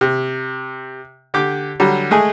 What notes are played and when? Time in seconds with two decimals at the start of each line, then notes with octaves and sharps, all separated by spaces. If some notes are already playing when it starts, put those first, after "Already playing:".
0.01 C3
1.34 D3 G4 D6
1.80 D3 F#3 G3
2.11 G#3 A3 G#4 G#5